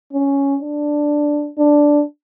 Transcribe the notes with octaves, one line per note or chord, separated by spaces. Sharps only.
C#4
D4
D4